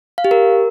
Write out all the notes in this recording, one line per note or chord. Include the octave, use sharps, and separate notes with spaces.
F5
G4
A#4